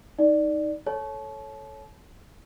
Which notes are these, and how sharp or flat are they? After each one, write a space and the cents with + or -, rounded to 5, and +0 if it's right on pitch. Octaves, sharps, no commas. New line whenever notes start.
D#4 +5 D5 +10
A4 +0 C#5 -5 A5 -35